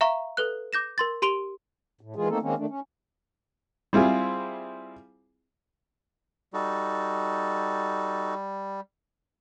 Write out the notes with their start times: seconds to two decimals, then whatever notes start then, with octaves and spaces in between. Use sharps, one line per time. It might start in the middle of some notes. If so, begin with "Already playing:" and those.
0.01 E5 F5 A#5 C#6
0.37 A4 B4 F#6
0.73 D6 G6 A#6 E7
0.98 A#4 C6 A6
1.22 G4 C6 D7 F7 G7
2.01 A2
2.16 D#3 E3 G#3 F4 G#4
2.29 A3 A#3 C4 D#4 A4
2.42 D#3 G#3 A#3 C4 C#4
2.58 D#3 A3 D4
2.69 C#4
3.93 G3 C4 E4 F4 G#4
6.54 G3 D#4 F#4 A4